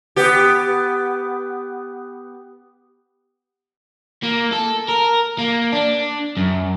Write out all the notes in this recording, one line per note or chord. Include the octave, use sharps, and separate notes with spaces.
B3 G4
A#3
A4
A#4
A#3
D4
F#2